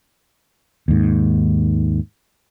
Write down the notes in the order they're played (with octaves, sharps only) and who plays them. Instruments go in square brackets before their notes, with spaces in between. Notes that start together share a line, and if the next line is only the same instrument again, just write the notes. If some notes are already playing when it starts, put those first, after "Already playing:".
[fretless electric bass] D#2 G#2